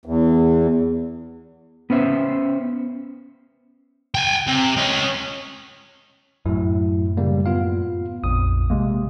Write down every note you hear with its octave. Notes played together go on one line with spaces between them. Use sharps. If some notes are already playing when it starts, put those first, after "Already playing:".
E2
B3 C#4 C5 E5
G5 G#5
C3
C#4 D#5
F#2 A2 F#3 E4
C#3 G3 A#3
B3 F4 F5
A#1 F2 D#6
C3 G#3 A#3